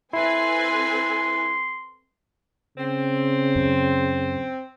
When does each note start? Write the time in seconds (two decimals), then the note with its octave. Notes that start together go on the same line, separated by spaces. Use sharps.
0.13 C4 E4 A4 B4 G#5 C6
2.78 C#3 C4
3.56 F#2